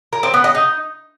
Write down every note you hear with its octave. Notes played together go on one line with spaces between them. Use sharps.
A#4
C4
B3
D#5
D#4